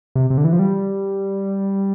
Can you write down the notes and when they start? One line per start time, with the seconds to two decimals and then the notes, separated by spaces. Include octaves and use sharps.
0.15 C3
0.30 C3
0.38 D3
0.45 E3
0.52 F3
0.59 G3